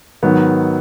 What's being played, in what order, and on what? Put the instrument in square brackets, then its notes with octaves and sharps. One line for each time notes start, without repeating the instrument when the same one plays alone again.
[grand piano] G#2 D#3 F#3 B3